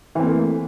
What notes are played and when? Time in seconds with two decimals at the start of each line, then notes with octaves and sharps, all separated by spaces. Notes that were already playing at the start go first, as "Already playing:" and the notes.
0.15 E3
0.19 C4
0.23 A#3
0.27 A3